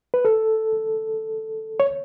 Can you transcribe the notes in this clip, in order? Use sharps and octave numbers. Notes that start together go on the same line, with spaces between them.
B4
A4
C#5